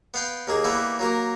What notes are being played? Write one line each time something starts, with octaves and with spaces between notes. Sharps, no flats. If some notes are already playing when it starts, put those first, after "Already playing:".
B3 F5 G5
D#2 A#3 G#4
E3 G3 A#3 B3 E4
F#3 A#3 A#4